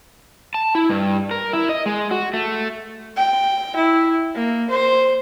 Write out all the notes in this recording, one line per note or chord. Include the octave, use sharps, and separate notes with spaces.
A5
E4
G2
A#4
E4
D#5
G#3
F#4
A3
G5
E4
A#3
C5